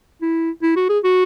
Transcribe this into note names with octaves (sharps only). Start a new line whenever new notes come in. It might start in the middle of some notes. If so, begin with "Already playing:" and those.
E4
E4
F#4
G#4
F#4